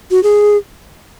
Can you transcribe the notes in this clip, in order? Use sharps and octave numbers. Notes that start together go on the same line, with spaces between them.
F#4
G#4